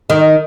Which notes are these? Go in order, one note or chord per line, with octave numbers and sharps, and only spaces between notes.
D#3